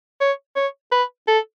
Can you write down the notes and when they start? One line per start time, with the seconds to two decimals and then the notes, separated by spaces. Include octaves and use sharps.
0.21 C#5
0.56 C#5
0.92 B4
1.28 A4